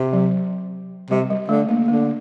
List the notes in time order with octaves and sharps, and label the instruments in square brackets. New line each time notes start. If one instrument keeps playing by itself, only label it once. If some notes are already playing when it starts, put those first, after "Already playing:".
Already playing: [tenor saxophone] C3
[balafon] F#3
[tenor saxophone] C3 [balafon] G3
[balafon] G3
[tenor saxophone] D3 [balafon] A3
[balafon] A#3
[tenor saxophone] D3 [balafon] A#3